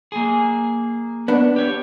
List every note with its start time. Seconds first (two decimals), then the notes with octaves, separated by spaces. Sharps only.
0.12 A#3 G#4
1.28 B3 D4
1.56 G4 C#5